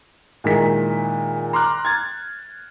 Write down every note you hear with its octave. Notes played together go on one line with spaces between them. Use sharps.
A#2 D#3 G#3 E4 A#4 B6
A#5 C6 D6 F6 F#6
G#6 A6